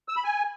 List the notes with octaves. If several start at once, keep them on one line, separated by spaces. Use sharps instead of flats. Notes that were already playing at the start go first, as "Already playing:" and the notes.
E6
B5
G#5